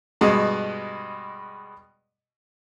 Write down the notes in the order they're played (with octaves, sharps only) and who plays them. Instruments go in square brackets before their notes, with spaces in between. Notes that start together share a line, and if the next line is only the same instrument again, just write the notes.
[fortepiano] G2 B2 G#3